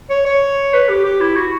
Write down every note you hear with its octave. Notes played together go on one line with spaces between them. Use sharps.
C#5
C#5
B4
G4
G4
E4
F#4